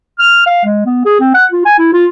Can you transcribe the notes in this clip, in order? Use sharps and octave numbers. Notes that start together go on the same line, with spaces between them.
F6
F5
G#3
B3
G#4
C4
F#5
F4
G#5
E4
F4